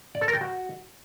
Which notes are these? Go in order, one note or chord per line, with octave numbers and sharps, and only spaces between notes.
D5
A4
A#4
G5
F#4